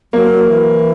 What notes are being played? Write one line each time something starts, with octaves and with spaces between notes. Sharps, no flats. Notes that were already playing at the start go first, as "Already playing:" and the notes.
F#3 A#3
E3